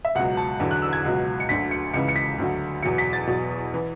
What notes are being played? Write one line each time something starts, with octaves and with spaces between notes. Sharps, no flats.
E5
C#2 B2 F#3 F#5
A5
E2 D3 F#3
F#6
E6
G#6
C#2 B2 F#3
C#7
D2 D3 F#3 B6
C#7
C#2 C#3 E3 C#7
C#7
B6
D2 D3 F#3
E2 B2 F#3 C#7
B6
A6
E2 B2 F#3
E3